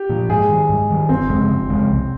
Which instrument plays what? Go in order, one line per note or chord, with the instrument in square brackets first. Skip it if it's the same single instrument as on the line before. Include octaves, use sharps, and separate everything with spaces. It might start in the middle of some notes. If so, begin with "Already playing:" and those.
Already playing: [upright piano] G4
[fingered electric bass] A#2 F3
[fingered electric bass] G#2 [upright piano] G#4
[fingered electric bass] D#3 G3
G#2
D#3 G3
[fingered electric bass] G1 [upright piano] C4
[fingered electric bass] F2 C#3 G#3
G1
F2 C#3 G#3
C2